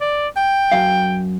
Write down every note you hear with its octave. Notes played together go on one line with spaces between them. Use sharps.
D5
G5
F#2 F5